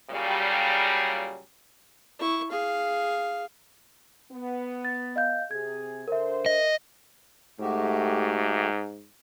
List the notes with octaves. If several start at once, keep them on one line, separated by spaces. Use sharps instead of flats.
A#2 C#3 F#3 G3
E4 C#6
G#4 F5
B3
A6
D#5 F5 G6
C3 G#4 G#6
D3 A#4 C5 E5
D#5
G#2 A3 F#4 G4